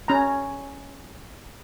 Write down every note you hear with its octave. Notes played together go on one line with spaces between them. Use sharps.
C#4 A#5